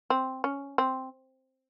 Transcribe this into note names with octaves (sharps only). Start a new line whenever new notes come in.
C4
C#4
C4